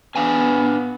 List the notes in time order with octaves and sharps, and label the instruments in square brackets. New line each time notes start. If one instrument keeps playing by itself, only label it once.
[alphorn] B3 [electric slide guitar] D4 F5 G#5